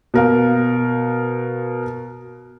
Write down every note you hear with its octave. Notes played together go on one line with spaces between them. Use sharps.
B2 A#4 F5